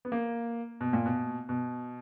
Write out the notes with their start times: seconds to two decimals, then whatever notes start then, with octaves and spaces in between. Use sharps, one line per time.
0.05 B3
0.12 A#3
0.81 B2
0.93 A#2
1.06 B2
1.49 B2